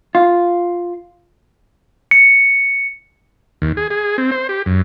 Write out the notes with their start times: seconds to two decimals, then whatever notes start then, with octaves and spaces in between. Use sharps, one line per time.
0.15 F4
2.11 C#7
3.62 D#2
3.77 G#4
3.90 G#4
4.18 C4
4.31 C5
4.49 G4
4.66 F#2